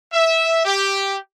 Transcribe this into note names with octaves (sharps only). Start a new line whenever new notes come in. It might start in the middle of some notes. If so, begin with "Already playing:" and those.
E5
G4